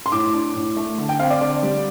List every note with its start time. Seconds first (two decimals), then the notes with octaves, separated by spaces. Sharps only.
0.06 C6
0.12 A2 D6
0.34 D4
0.55 A2
0.76 A3
0.98 D3
1.09 G5
1.19 C4 F5
1.30 D5
1.41 D3 D5
1.63 G3